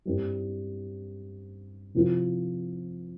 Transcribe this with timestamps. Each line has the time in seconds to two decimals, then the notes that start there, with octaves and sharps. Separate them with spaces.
0.05 G2 G3 C4
1.95 C3 F3 C4 F4